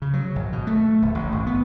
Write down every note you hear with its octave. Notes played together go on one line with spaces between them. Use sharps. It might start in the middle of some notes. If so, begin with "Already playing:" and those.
C#3
F#3
G#1
B2
A3
D1
A1
G#1
B3